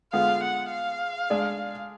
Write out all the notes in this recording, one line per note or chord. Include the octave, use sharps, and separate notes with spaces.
D3 G#3 B3 F4 F5
F#5
F5
G#3 D4 G#4 D5